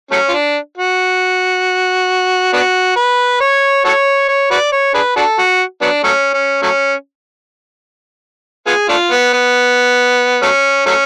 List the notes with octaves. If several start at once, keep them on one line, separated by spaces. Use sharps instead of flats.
F#3 A3 C#4
F4
D4
F#4
B3 D4 F#4
B4
C#5
F#4 A4 C#5
C#5
F#4 B4 D5
C#5
D4 G#4 B4
D4 F#4 A4
F#4
F#3 B3 D4
F#3 A3 C#4
C#4
F#3 A3 C#4
B3 F4 G#4
A3 D4 F4
B3
B3
F#3 A3 C#4
F#3 A3 C#4